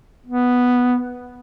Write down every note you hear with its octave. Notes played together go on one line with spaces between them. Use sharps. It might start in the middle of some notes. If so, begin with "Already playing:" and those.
B3